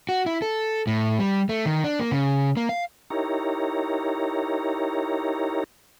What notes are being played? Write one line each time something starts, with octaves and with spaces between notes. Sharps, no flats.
F#4
E4
A4
A2
G3
A3
D#3
D4
A#3
C#3
A#3
F5
D#4 E4 G4 A#4 C#5 A#5